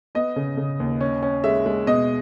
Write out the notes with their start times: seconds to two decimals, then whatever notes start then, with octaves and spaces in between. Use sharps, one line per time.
0.15 B3 D#5
0.36 C#3
0.57 C#3
0.80 D#2
1.00 C#4
1.22 C#4
1.44 G#3 E5
1.66 G#3
1.87 B2 D#5